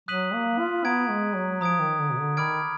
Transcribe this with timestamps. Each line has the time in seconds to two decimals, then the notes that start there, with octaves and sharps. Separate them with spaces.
0.08 F#3 D#6 F#6 B6 D#7 F#7
0.34 A#3
0.59 F4
0.85 B3 A#5 D#6 G#6 D7
1.10 G#3
1.35 F#3
1.61 F3 A#5 D#6 G#6 D7
1.80 D#3
1.99 D3
2.11 B2
2.18 D3
2.37 D#3 B5 D6 F6 G#6 D7